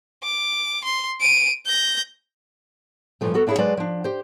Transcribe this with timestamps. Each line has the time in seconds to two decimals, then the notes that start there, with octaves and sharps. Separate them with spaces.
0.23 D6
0.85 C6
1.20 D7 D#7
1.66 G6 A#6
3.21 G2 A#2 C#3 E3 F3 A3
3.34 B3 F#4 A4 A#4
3.47 A#3 D4 E4 F4 G#4 C#5
3.58 F#3 G#3 B4 C5 D5 A5
3.77 F3 D4
4.04 G4 C5